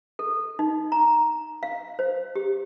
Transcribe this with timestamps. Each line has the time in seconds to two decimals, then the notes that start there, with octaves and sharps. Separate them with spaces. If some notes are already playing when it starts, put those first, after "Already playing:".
0.19 A4
0.59 D#4
0.92 A#5
1.63 F5
1.99 C5
2.35 G4